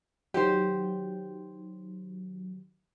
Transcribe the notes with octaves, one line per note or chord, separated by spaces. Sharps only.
D#3 F#3 G4 C5